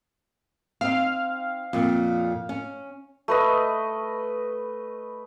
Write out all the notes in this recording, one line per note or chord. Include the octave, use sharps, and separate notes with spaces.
C4 D#4 F5
F2 A#2
C#4
A3 B4 D#5